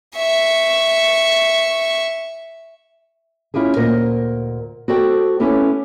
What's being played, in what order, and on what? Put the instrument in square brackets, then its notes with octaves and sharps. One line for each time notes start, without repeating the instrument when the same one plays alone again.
[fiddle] E5 C#6
[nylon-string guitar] C#4 E4 F4 G4 G#4
D2 A#2 A#4 C5 D#5
F#4 G4 A4 C5 D5 G5
B3 C#4 E4 G4 A4